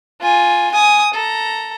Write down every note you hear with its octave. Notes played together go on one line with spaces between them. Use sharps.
F4 G#5
G#5 D#6
A4 A#5